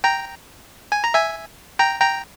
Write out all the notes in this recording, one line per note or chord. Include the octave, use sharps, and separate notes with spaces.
G5 A#5
G#5
A#5
E5 G#5
G5 A#5
G5 A#5